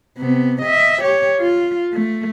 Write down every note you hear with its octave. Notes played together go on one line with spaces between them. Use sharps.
C3 B3
D#5 E5
G4 C#5
F4
A3